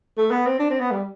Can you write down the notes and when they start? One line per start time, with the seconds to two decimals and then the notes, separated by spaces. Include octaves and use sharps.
0.18 A3
0.31 B3
0.46 C4
0.59 D4
0.70 C4
0.80 B3
0.91 G3